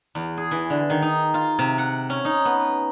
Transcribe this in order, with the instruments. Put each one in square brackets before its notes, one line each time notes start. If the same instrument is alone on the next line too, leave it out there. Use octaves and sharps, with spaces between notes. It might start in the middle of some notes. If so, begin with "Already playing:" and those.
[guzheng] E2
G#4
E3
D3
D#3
D#4
F4
C3
F#5
C#4
D#4
B3